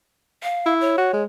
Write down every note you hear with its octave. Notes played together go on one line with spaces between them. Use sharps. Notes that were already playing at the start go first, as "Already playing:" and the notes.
F5
E4
C#5
F#4
G#3